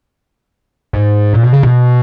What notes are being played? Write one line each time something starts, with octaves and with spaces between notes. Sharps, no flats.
G#2
A#2
B2
C#3
B2